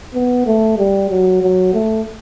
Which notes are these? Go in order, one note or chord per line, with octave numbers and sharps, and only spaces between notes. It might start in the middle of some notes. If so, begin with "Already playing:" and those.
B3
A3
G3
F#3
F#3
A3